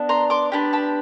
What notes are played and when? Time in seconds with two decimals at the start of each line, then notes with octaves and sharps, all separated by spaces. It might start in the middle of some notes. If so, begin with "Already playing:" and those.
Already playing: B3 D4
0.09 A#5 C6
0.30 C6 D6
0.52 B3 D4 G4
0.73 A5 B5